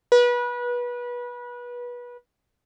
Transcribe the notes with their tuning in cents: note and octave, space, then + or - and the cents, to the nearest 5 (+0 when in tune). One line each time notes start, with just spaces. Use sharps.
B4 -25